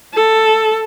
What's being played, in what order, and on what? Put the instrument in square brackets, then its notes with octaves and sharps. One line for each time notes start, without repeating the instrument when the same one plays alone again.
[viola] A4